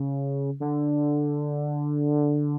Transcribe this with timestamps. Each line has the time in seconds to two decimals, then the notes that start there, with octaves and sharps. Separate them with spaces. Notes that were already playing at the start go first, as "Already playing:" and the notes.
Already playing: C#3
0.60 D3